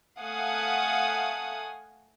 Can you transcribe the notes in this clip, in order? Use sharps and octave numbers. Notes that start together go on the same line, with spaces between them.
A3 F5 F#5 G#5 D#6